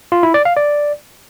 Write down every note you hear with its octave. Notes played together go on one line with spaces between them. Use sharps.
F4
E4
D5
F5
D5